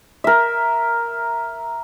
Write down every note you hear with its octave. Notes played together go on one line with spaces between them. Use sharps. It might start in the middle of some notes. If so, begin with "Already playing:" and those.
A#4 E5